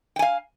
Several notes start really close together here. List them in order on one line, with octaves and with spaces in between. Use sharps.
G5 G#5 F5